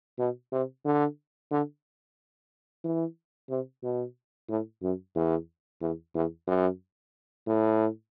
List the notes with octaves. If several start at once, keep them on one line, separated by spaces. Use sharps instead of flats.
B2
C3
D3
D3
E3
C3
B2
A2
F#2
E2
E2
E2
F#2
A2